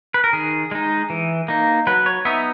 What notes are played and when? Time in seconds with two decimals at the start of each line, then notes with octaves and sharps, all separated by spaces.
0.14 B4
0.24 A#4
0.33 D#3 G#4
0.71 G#3 D#4
1.10 E3
1.48 A#3 D#4
1.87 F#3 B4
2.06 C#5
2.25 B3 D#4 E5